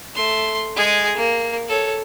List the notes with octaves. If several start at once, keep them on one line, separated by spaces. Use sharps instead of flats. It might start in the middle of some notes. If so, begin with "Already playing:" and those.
A3 C6
G#3 G#4
A#3
A4 C#5